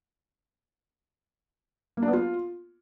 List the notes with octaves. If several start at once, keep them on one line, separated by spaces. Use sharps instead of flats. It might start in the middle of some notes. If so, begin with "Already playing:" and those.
A#3
D4
B3
F4